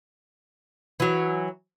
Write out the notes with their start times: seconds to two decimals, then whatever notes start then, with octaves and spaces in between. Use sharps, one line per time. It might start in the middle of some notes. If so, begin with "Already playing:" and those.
1.00 E3 F#3